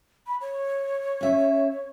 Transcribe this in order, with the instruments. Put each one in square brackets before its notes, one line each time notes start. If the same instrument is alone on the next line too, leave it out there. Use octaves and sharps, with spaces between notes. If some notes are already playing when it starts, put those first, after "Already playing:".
[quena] B5
C#5
[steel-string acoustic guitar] C#4 E5